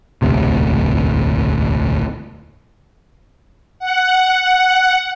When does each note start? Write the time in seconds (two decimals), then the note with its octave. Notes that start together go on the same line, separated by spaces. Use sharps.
0.22 E1 A1 D2 C3
3.79 F#5